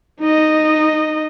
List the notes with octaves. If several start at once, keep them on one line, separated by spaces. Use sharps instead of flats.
D#4 D#5